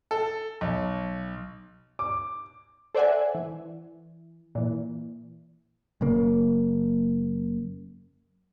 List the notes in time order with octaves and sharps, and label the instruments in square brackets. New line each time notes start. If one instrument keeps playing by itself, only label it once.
[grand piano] A4
B1
D6
[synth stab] A4 C5 D5 E5 F#5 G#5
E3
A#2 E3
[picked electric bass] F#1 F#2 C#3 A#3